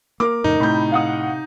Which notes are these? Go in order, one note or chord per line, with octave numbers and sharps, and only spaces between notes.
A#3 A#4 D6
F2 A2 C#3 D#4
A2 C3 B5 G6
F5 F#5 D#6